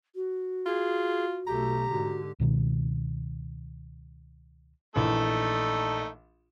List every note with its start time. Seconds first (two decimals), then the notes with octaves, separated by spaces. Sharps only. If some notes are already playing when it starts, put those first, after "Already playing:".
0.15 F#4
0.66 F4 G#4
1.47 B1 A3 G4 A#5
1.90 G#2 D3 F#4
2.40 C#2 B2 D#3
4.96 A#1 E3 A3 D#4 A4